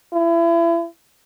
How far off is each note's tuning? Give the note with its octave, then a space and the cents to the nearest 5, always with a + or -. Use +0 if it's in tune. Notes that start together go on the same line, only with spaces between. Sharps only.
E4 +35